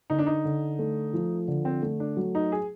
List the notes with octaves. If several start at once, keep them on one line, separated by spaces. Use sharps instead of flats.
D3 D#4
D4
D#4
D3
A3
F3
D3
C4
A3
D4
F#3
D#4
G#4